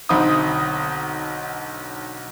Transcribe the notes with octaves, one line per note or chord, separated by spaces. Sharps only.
B1 D3 C4 D#4 B5 D#6